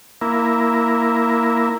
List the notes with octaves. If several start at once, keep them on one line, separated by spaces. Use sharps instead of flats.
A#3 E4